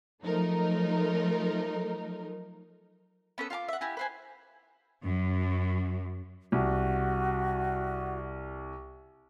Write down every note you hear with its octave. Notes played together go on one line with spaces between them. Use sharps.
F3 F#3 A3 D#4 A#4
B3 C#4 A4 B4
F4 F5 A5 D6
E5 F#5
E4 F#4 G4 G#5
B4 C5 G#5
F#2
C2 F#4